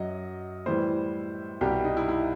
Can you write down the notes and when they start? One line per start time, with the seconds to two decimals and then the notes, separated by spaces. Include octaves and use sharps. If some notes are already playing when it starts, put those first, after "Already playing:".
Already playing: F#2 F#3 D#5
0.66 A2 E3 G3 C5
1.61 C2 B2 G3 G4
1.84 D#4
1.97 E4
2.09 E4